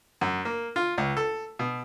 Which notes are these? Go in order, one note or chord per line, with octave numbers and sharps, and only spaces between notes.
F#2
A#3
F4
C#2
A4
B2